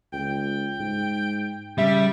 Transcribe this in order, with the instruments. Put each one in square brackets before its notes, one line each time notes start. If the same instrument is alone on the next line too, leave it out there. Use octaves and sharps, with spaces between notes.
[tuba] C#2 [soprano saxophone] G5
[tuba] G#2
[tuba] C#3 [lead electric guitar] G3 [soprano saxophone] E5